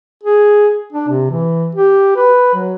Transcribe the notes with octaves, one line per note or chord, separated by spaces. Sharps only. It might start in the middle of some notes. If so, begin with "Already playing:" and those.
G#4
D4
C3
E3
G4
B4
F#3